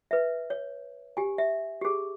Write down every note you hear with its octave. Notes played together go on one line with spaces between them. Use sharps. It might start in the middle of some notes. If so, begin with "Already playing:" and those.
B4 E5
C#5
G4 G#5
E5
G4 G#4